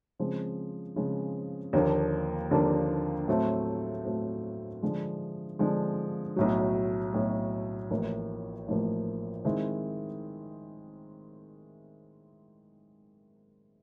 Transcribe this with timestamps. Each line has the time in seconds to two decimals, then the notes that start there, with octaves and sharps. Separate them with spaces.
0.19 C#3 F3 G#3 C4
0.96 C#3 F3 G#3 C4
1.73 D#2 D3 F3 A#3 D4
2.51 D#2 D3 F3 A#3 D4
3.28 A2 F#3 A3 C4
4.05 A2 F#3 A3 C4
4.82 D3 F3 G#3
5.59 D3 F3 G#3
6.36 B1 A2 F#3
7.14 B1 A2 F#3
7.91 A1 A2 F3 A#3
8.68 A1 A2 F3 A#3
9.45 D#3 G#3 C4 E4